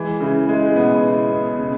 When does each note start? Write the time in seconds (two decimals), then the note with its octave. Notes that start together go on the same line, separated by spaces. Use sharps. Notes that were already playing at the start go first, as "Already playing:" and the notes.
Already playing: E3 G#3
0.21 C#3 E4
0.48 G#3 E4
0.66 G#3
0.76 B2 B3
1.03 E4
1.31 B2
1.59 C#3